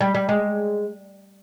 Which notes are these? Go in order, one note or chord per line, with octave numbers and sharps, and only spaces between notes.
G3
G3
G#3